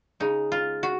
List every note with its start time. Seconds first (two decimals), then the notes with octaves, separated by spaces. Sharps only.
0.20 C#3 G#3 D#4
0.52 F4
0.83 F#4